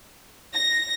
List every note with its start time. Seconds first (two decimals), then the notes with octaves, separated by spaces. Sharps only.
0.54 A#6